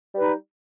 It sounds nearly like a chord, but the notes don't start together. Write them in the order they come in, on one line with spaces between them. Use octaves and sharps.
G3 B4 D#4